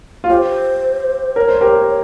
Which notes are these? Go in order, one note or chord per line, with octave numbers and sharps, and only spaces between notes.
F4
G4 C5 C#5
A#4 C#5
C5
G4 A#4